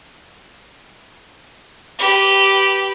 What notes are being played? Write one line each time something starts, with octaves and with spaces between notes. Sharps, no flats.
G4 B4